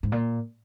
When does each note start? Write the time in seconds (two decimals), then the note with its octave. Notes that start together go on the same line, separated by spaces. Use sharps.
0.03 G#2
0.12 A#2